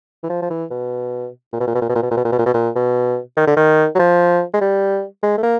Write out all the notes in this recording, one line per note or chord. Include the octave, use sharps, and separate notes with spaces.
E3
F3
F3
E3
B2
A#2
B2
A#2
B2
A#2
B2
A#2
B2
A#2
B2
A#2
B2
A#2
B2
A#2
B2
D#3
D3
D#3
F#3
F3
G#3
G3
G#3
A3
A#3